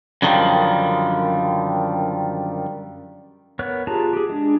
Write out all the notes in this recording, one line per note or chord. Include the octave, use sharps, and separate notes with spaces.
F#2 D3 D#3 F3 G3
B3 A#4 C#5 F#6
F4 G4 G#4 A5 A#5
G4 G#4
G#3 D4